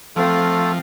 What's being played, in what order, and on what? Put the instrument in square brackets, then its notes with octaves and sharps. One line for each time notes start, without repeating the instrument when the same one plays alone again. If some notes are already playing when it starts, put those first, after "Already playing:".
[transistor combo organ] F3 [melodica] A3 A4 [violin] C4 [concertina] F4